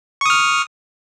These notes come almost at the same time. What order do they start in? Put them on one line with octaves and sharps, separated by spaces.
C#6 D#6 F6